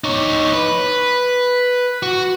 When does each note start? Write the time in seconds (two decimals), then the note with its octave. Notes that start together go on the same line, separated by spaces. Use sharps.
0.04 D#4 C#5
0.53 B4
2.03 F#4